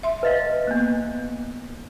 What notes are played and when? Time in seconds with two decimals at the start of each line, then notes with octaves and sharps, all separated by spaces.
0.03 E5 C6
0.23 B4 D#5 F5
0.67 A#3 B3